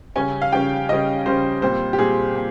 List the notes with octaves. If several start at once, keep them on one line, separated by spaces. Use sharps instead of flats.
C#3 G3 C#4 G#5
F5
C#3 G3 C#4 G5
C#3 G3 C#4 D#5
C#3 G3 C#4 C5
A#2 G3 C4 C5
G4
A#2 G3 C4 G#4
A#2